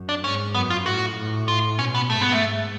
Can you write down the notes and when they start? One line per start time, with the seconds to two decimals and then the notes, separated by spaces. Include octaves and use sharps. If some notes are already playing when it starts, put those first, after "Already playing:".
Already playing: F#2
0.09 D4
0.24 G#2 C#4
0.55 F#2 B3
0.70 F4
0.86 A2 F#4
1.17 A2
1.48 F4
1.79 B2 C#4
1.95 B3
2.10 G#2 A3
2.21 B3
2.32 A3
2.41 G#2